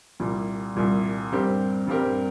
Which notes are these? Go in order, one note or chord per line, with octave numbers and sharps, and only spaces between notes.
C2 A#2 G3
C2 A#2 G3
G2 G3 C4 G4 A#4
G2 G3 C4 G4 A#4